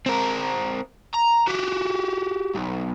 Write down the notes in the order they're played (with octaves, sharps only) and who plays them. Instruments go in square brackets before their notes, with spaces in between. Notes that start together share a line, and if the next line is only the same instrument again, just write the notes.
[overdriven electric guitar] C4 A#4
A#5
F#4 G4
B1